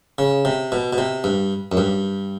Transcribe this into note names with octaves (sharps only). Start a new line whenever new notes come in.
C#3
C3
B2
B2
C3
G2
F#2
G2